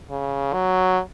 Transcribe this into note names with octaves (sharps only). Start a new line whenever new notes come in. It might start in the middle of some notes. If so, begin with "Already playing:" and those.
C#3
F#3